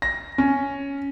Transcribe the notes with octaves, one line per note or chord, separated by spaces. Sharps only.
A#6
C#4